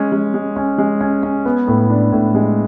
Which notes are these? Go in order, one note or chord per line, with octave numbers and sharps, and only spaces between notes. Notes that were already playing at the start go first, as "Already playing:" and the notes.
Already playing: G#3 C#4
G#3
G#3
C#4
G#3
C#4
C#4
B3
A2
D4
A2
G#3